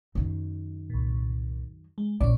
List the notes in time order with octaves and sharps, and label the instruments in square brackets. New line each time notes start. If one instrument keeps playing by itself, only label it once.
[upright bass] F#2 D#3
[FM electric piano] C2 A#2
G#3
[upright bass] A#1 [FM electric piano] C#4 D5